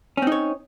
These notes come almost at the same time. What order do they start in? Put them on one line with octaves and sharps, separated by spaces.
C#4 C4 D#4 C#5